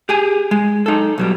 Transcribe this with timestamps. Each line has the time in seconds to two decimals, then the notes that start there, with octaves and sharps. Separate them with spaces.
0.09 G4 G#4 G#5
0.51 G#3
0.86 D#4 A4
1.18 B1 F#3 G3